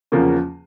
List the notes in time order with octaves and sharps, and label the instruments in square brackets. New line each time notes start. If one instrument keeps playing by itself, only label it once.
[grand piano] E2 C#3 F3 A#3 C#4